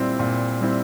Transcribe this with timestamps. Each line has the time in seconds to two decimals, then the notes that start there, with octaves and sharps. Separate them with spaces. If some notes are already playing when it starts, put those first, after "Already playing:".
Already playing: A#2 G3 C4 E4
0.19 A#2
0.61 G3 C4 E4